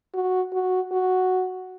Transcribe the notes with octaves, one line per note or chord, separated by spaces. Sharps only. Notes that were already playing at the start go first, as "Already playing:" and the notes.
F#4
F#4
F#4